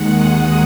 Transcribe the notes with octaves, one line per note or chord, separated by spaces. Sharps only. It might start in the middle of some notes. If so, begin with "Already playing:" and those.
Already playing: D#2 D#3 G#3 F#5
D#6